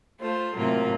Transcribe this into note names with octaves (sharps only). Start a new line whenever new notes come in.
A3 F4 C5
A2 C3 F#3 A#3 F4